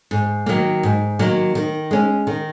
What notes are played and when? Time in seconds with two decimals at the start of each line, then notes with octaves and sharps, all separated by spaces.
0.11 G#2
0.46 D#3 F#3 A#3
0.83 G#2
1.19 D#3 F#3 A#3
1.55 D#3
1.91 G#3 C#4
2.27 D#3